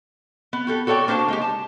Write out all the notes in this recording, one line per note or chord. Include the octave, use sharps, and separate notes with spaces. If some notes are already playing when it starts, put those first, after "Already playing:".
B3
F#4 G4 A4
F#4 A4 C#5 D5 G5
A#3 D4 C5 F#5 A5
G#3 D#4 G4
A5